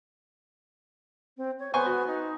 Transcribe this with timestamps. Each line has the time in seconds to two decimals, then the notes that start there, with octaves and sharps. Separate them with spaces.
1.37 C4
1.59 C#5
1.74 B3 C5 G#5 C#6
1.86 F#4
2.07 D#4